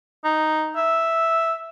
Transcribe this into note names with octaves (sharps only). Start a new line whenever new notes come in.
D#4
E5